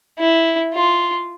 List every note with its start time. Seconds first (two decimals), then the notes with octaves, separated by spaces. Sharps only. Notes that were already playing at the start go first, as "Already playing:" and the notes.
0.19 E4
0.74 F4